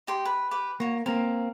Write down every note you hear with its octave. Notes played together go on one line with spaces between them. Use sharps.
D#4 G4 C6
B4
G4 B4 D6
A#3 F#4 C#5
A#3 C4 A#4